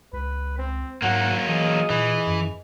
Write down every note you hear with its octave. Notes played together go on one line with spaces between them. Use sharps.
C#2 B4
C4
G#2 F#3 A#3 F#5
E3 G#4 D#5
A#2 E3
F#2